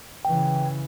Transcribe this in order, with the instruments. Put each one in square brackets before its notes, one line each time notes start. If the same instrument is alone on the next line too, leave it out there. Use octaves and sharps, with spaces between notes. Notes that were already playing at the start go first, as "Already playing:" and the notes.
[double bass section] C#3 E3 [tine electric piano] G5